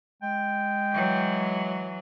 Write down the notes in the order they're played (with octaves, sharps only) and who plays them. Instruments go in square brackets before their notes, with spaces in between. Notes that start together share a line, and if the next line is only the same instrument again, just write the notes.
[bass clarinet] G#3 [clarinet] G5
[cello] E3 F#3